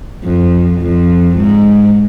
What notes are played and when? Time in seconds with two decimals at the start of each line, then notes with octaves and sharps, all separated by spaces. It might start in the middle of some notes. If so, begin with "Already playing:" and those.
0.24 F2
0.80 F2
1.37 G#2